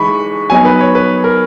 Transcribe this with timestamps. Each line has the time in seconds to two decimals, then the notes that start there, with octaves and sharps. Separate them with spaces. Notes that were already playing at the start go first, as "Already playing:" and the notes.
Already playing: E3 G#3 D#4 B5 C#6
0.50 F#3 B3 D#4 G#5
0.65 B4
0.81 C#5
0.95 B4
1.24 A#4